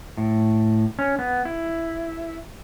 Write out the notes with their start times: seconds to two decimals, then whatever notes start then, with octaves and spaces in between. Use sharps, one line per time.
0.17 A2
0.99 C#4
1.19 B3
1.45 E4